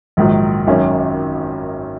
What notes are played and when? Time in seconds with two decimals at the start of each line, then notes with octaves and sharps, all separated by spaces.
0.17 A#1 G#2 D#3 F#3
0.67 G#1 F#2 D#3 F#3 C#4